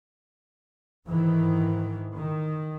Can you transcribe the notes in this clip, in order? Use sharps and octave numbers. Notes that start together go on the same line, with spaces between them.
G#2 D#3 E3
D#3